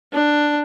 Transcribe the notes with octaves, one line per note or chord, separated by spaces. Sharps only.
D4